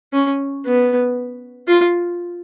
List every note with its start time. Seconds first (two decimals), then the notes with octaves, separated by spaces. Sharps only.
0.13 C#4
0.65 B3
1.67 F4